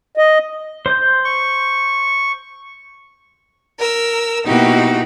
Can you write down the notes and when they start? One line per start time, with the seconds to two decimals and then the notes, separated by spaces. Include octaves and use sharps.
0.17 D#5
0.86 C5 C6 G6
1.25 C#6
3.79 A#4 E6
4.45 B2 A#3 D#4 E4 F#4 G4